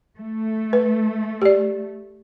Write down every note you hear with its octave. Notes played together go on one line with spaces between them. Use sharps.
A3
B4
G4 D5